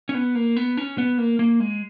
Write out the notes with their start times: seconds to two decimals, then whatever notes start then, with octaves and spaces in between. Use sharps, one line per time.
0.09 C#4
0.15 B3
0.35 A#3
0.57 B3
0.77 C#4
0.98 B3
1.18 A#3
1.39 A#3
1.60 G#3